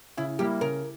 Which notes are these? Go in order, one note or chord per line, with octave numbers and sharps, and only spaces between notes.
C#3 E4
G3 A#3 E4 G4
C#3 A#4